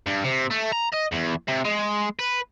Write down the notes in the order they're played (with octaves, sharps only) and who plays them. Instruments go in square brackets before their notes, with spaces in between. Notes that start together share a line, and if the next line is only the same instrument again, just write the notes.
[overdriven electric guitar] G2
C3
A3
A#5
D#5
E2
C3
G#3
B4